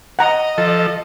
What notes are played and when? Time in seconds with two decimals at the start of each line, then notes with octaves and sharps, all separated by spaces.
0.19 D#5 F#5 A#5
0.58 F3 A4